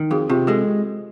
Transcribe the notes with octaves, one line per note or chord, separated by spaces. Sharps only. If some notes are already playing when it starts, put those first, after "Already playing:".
Already playing: D#3
F2 F#4 G#4
C3 F4 G4
G#3 G4 A4